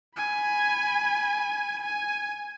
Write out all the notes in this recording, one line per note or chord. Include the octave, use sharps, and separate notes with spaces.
G#5 B5
G#5